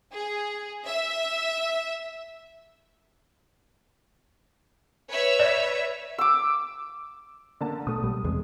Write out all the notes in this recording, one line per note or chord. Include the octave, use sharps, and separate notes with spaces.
G#4
E5
B4 C#5 E5
D5
D6 E6
D3 A#3 A5
B2 A3 D#6
B1 G3 A3
E2 C3 G#3